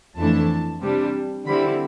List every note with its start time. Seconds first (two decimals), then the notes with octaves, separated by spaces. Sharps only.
0.17 F2 E3 A3 D4 A5
0.81 C3 G3 D4
1.46 D3 G3 C4 E4 B5